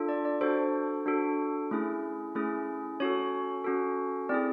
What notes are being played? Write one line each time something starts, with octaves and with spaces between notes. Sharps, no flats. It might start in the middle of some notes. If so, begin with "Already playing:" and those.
Already playing: D4 F4 A4
D5
D5
D4 F#4 A4 C5
D4 F#4 A4
A3 C#4 E4 G#4
A3 C#4 E4 G#4
C#4 F#4 A4 C#5
C#4 F#4 A4
C4 E4 G#4 D5